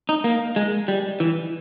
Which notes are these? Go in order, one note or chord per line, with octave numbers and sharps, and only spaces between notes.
D#4
A#3
G#3
G3
E3